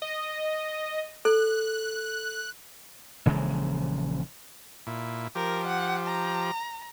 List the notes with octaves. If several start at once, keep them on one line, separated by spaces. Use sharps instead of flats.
D#5
A4 F#6
A#1 C#3 E3 G#3
A#2 E4
F3 G4 A#4
F#5
A#5